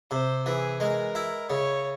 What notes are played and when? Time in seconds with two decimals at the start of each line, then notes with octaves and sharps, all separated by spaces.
0.11 C3 C5
0.45 E3 G#4
0.80 G#3 A#4
1.15 E4
1.50 C#3 C#5